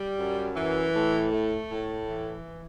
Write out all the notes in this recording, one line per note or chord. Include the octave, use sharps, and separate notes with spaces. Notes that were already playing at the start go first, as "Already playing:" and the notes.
Already playing: G3
F#2
E3
A2
A3
A2
E3